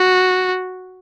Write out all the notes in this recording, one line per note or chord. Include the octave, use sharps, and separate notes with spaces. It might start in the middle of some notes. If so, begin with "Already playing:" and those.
Already playing: F#4